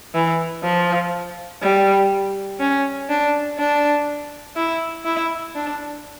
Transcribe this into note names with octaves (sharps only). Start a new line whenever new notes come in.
E3
F3
G3
C#4
D4
D4
E4
E4
D4